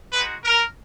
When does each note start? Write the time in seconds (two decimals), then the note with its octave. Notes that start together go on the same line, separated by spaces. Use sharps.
0.13 G#3 D#4 F#4 B4
0.44 A#4